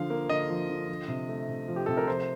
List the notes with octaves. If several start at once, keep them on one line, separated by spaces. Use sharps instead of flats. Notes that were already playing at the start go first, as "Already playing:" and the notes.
Already playing: D3 F3 F5
A#3
D3 D#5
F3
D3
F3
C3
A3
C3
F3
G4
C3 A4
A#4
F3 C5